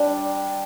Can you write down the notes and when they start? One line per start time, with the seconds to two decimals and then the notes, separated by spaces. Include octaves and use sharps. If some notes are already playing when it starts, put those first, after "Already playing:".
Already playing: G3 D4 G4